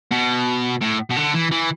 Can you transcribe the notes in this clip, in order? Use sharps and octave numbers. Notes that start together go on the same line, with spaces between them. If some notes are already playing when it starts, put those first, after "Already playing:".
B2
A2
B2
D3
E3
E3